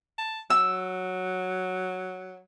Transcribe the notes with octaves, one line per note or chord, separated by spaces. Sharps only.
A5
F#3 E6